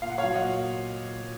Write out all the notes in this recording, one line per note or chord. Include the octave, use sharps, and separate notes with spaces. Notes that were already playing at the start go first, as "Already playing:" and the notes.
A#2 F5
F#5
C#5 F5
F#3
D#5 F#5
A#2